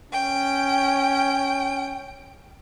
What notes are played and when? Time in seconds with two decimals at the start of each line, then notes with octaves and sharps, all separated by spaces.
0.12 C#4 G5